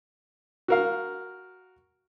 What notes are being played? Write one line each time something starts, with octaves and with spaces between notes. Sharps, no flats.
F#4 A#4 F5